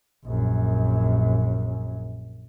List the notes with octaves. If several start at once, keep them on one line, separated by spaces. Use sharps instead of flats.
A#1 F#2